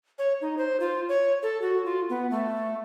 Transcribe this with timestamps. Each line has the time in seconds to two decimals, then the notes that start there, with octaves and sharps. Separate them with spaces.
0.19 C#5
0.41 D#4
0.58 C5
0.80 F4
1.09 C#5
1.43 A4
1.62 F#4
1.85 F4
2.09 B3
2.31 A3